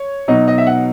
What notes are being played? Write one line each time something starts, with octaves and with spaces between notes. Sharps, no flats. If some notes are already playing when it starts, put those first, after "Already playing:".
Already playing: C#5
B2 F#3 B3 D#4 D#5
D#5
E5
F#5